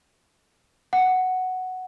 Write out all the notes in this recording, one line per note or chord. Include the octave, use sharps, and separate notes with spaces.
F#5